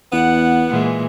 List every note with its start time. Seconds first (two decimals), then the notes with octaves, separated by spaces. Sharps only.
0.13 E2 B3 F#5
0.69 A#2 E3 G#3